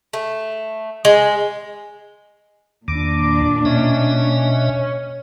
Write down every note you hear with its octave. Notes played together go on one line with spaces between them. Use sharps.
A3
G#3
E2 A#2 D#3 D4 D6
B2 C#4 D#5 E5